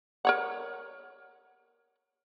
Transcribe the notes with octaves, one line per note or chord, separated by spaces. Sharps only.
A#4 C#5 F#5